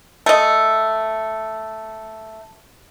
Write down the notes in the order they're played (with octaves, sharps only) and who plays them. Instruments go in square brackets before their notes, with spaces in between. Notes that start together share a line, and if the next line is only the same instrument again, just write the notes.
[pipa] A3 D#5